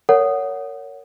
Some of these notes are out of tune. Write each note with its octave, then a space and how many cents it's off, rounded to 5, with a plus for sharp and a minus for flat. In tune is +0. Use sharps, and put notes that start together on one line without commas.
A#4 -20 C#5 +20 F#5 +0